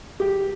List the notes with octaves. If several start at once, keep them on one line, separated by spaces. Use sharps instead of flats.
G4